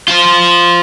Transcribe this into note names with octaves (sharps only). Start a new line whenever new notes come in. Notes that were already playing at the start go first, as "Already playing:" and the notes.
F4 C5